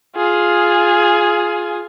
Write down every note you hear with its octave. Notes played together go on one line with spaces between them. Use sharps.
F4 G#4